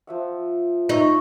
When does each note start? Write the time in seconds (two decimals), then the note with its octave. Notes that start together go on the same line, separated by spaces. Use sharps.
0.07 F3 E5 F#5
0.89 D#4 C#5 E5 C#6